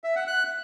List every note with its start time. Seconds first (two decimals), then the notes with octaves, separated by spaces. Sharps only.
0.04 E5
0.16 F#5
0.27 F#6